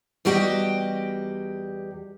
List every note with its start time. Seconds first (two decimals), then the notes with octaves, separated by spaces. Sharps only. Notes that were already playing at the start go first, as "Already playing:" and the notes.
0.25 E2 G3 F#4 G4 D#5 G5